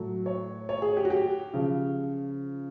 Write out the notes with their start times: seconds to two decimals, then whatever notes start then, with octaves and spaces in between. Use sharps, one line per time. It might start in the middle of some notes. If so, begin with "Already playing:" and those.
Already playing: A2 F#3 A3
0.26 C#5
0.69 C#5
0.82 G#4
0.97 G4
1.05 F#4
1.10 G4
1.54 C#3 F3